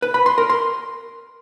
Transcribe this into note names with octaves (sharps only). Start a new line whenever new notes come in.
B4
B5
C6
A#4
C6